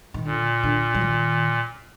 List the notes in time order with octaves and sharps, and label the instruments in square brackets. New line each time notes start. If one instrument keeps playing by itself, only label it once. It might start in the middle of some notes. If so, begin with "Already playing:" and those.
[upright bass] D#3
[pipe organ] A#2 [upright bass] D3
[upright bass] D3
F3
D#3